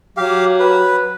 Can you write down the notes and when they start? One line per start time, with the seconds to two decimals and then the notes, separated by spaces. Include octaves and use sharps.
0.17 F#3 G4 F5
0.60 B4